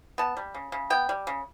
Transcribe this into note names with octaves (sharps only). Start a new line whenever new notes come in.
B3 A5
G3
C#3
C#3
B3 G5
G3
C#3